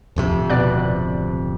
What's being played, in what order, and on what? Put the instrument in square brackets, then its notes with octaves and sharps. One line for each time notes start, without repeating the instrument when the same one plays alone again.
[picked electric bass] D1 F2 C3
[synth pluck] B2 D5 F#6